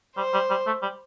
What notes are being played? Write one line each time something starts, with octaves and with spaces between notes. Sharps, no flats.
G3 C5
G3
G3
A3
G3